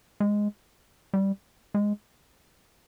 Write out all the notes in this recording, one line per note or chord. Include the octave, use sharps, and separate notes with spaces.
G#3
G3
G#3